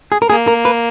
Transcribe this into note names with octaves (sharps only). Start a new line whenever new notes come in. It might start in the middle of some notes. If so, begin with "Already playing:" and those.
G#4
A#4
A#3 G#4
A#4
B4